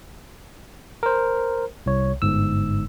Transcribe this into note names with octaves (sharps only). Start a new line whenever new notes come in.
A#4 C5
C2 C#5
G1 G#2 E6